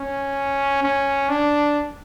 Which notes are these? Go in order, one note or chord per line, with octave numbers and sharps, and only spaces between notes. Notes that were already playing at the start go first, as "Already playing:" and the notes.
Already playing: C#4
C#4
D4